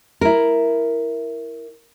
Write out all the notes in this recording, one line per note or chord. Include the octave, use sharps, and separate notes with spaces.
E4 A#4